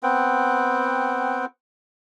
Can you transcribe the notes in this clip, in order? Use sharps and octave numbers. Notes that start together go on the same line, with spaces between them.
B3 C4 F#5 G5